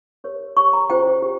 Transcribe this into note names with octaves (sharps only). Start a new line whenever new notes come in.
G4 A#4 C#5
G4 C#5 C#6
A#5
C#4 F4 G#4 C5 G5
G4